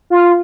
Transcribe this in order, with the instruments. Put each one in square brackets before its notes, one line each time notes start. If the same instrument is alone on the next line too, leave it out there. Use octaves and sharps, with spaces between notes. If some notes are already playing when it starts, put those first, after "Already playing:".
[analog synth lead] F4